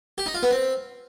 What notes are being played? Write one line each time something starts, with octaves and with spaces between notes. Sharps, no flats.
G4
D#4
F4
B3
C4